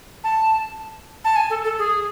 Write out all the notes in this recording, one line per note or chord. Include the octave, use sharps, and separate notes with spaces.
A5
A5
G#5
A4
A4
G#4